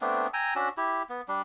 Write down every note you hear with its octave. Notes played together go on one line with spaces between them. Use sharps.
A3 B3 C4 D4
G5 G#5 A#5 E6
C#4 D4 F#4 E6
E4 G4
B3
G3 D4